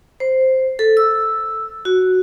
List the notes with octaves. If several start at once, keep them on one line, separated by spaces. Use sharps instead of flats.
C5
A4
E6
F#4